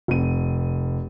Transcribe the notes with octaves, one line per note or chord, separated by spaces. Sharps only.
F1 C4 D#7